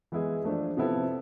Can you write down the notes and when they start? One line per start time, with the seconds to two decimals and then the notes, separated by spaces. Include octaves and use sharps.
0.12 E3 G#3 B3 E4 G#4
0.44 F3 A3 D4
0.77 C3 F3 B3 E4 A4